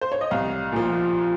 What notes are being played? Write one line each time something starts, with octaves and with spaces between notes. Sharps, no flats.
C5
C#5
D#5
C2 F5
A#2 F3